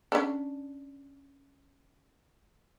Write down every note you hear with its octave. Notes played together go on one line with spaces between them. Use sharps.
C#4 D4